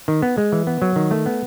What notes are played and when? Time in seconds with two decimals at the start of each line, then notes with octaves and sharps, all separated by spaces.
0.08 D#3
0.22 B3
0.38 G#3
0.52 E3
0.67 B3
0.82 F#3
0.96 D#3
1.11 A3
1.26 B3